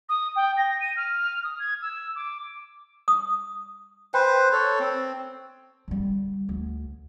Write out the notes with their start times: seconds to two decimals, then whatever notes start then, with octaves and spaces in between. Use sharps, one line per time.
0.09 D#6
0.36 G5
0.57 A#6
0.80 D#7
0.96 F6
1.44 D#6
1.59 G#6
1.82 E6
2.15 D6
3.08 D#6
4.14 B4 C5 G5
4.52 A4 C#5
4.79 C4
5.88 D3 G3
6.49 D2